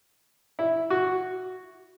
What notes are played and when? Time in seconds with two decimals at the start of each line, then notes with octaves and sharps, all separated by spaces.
0.59 E4
0.90 F#4